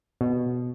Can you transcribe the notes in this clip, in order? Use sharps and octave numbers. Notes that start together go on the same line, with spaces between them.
B2